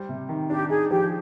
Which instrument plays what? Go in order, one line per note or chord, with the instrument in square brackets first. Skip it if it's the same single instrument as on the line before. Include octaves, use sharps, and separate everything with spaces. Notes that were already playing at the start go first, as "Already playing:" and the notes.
Already playing: [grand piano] G3 C5
C3
D#3
[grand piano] D4 [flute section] G4
[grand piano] D#4 [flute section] G#4
[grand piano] F3 [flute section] G4